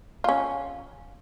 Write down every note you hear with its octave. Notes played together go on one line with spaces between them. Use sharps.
C#4 F4